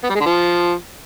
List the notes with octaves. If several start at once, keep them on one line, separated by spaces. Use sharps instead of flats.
B3
G3
G#3
D3
F3